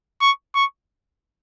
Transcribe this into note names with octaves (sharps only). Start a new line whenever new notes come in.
C#6
C#6